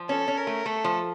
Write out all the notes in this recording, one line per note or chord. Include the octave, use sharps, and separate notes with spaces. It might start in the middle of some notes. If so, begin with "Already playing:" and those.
Already playing: F3
C#4 A4
C#4
A#4
A3
A3 A4
F3